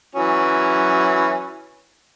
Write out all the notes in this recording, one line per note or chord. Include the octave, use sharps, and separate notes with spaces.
E3 F#3 C#4